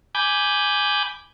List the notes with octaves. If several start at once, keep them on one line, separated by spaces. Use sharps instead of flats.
G#5 B5 D6 G6